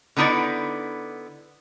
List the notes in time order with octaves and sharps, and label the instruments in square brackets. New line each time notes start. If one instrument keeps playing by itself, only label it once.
[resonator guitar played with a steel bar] D3 B3 D#4 E4 D5